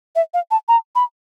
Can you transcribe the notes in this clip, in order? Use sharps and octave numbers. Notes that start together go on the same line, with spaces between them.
E5
F5
A5
A#5
B5